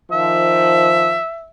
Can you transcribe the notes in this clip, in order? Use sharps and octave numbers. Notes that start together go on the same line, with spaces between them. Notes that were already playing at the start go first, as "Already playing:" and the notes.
D#3 F3 E5